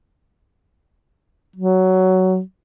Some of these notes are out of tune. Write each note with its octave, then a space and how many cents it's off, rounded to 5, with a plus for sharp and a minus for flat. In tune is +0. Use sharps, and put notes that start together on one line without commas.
F#3 +10